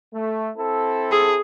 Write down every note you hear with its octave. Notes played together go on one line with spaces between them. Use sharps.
A3
C4 E4 A4
G#4